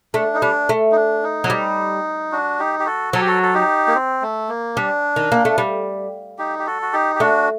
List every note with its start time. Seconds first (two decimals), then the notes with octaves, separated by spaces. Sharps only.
0.14 A3 D4
0.34 D#4
0.41 G3 D4
0.69 A3
0.92 D#4
0.96 D4
1.24 D#4
1.44 F#3
1.50 G3
2.32 D4 F#4
2.59 D#4 G4
2.80 G4
2.86 F#4 A4
3.13 F#3 A4
3.21 G4
3.27 F#4 A4
3.43 A4
3.54 D#4 G4
3.88 A#3
3.95 C4
4.22 A3
4.49 A#3
4.76 G3 D4
5.16 D#3
5.32 A#3
5.45 A3
5.58 G3
6.38 D#4 G4
6.59 G4
6.67 F#4 A4
6.82 F#4
6.93 D#4 G4
7.16 G4
7.20 A3 D4 F#4